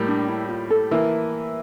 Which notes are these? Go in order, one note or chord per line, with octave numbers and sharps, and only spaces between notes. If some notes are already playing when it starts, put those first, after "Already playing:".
Already playing: A2 G3 A#3
D4
E4
F4
A4
E3 A#3 E4